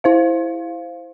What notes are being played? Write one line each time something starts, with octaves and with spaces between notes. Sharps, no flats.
E4 C5 F5